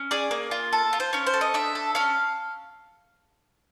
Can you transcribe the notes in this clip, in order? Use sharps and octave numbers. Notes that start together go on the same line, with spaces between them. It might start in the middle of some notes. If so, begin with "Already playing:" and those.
Already playing: C#4
G#4 D5
A#3
F4
A4
F4
C5
C#4 C#5
C5
A4
D#5
D4 E5
A4
C#4 F5